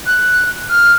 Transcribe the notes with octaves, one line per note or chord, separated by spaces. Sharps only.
F#6
F6